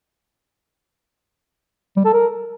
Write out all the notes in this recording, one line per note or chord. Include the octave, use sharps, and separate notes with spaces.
G3
A4
A#4